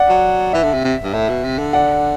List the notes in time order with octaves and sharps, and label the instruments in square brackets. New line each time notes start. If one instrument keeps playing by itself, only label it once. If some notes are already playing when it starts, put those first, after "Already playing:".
Already playing: [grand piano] D5 F#5
[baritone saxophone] F#3
[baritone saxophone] E3 [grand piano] E5
[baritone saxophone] D3
C3
C3
G2
[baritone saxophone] A2 [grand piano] E5
[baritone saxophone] B2
C3
D3
[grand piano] D5 F#5